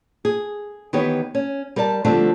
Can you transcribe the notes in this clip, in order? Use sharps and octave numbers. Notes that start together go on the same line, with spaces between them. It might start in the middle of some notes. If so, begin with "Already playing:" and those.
G#4
D#3 E3 B3 G4 C#5
C#4
G3 A#4 D5 G#5 A5
D3 F3 G3 A3 C4 D4